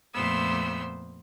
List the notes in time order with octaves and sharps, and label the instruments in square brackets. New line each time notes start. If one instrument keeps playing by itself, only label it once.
[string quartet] F2 A#2 A3 B3 C5 E6